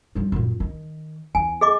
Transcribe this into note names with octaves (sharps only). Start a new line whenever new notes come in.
F3 G3
F#2 A#2
D#3
E2 G#5
G#4 D#5 D6